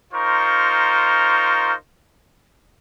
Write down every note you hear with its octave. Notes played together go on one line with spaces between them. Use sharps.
D#4 F4 A#4 C5 C#6